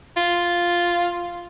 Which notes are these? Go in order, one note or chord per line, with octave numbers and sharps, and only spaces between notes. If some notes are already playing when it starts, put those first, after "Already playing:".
F4